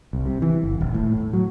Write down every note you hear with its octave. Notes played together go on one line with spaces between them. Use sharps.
C2
C3
E3
G1
D#1
A2
A2
F#3